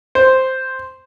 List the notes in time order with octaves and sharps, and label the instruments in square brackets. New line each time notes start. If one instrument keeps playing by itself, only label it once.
[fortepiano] C5